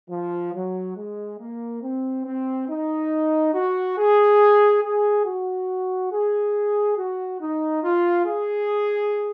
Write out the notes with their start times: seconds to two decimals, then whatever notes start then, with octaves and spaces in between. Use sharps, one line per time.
0.10 F3
0.54 F#3
0.97 G#3
1.39 A#3
1.83 C4
2.25 C4
2.68 D#4
3.54 F#4
3.97 G#4
4.83 G#4
5.25 F#4
6.11 G#4
6.97 F#4
7.41 D#4
7.83 F4
8.26 G#4